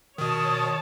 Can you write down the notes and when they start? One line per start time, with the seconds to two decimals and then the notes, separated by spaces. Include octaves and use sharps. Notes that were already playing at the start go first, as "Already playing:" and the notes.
0.18 B2 D#3 C#5 A5 D#6